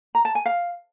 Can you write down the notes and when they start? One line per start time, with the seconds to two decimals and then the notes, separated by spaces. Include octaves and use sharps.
0.15 A#5
0.25 A5
0.35 G#5
0.46 F5